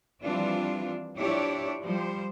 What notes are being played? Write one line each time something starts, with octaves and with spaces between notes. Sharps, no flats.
E3 F3 G3 C4 D4 F4
F3 D4 E4 G4 C#5 D5
F3 G3 C5